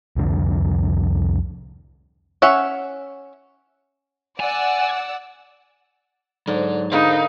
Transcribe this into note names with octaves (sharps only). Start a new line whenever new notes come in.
C2 F2 D3
C#4 E5 F#5
D5 F#5 G#5 E6
G#2 D3 F#3
G#2 D3 D#4 A#4 B4 F5